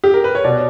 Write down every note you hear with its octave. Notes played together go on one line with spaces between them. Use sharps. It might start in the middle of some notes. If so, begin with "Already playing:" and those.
G4
A#4
B4
C#5
B2 D5